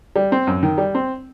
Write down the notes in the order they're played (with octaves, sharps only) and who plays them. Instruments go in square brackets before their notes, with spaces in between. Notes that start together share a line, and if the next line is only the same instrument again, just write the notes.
[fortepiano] G3
C4
F#2
D#3
G3
C4